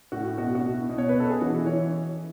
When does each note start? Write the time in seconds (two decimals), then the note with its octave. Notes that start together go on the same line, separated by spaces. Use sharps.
0.12 A2 F#4
0.38 B2 F#4
0.55 F#4
0.63 B2
0.72 E4
0.89 B2
0.98 C#5
1.09 B4
1.15 B2 A4
1.30 G#4
1.41 E3 F#4
1.66 E3 C#5